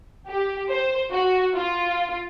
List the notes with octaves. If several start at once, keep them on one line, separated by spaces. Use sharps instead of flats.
G4
C5
F#4
F4